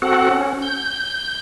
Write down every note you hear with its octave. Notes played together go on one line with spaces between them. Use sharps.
C4 F#4 A4 F#5
C#4
G6